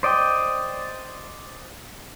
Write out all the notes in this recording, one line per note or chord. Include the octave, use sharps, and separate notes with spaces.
C5 D5 D#5 G5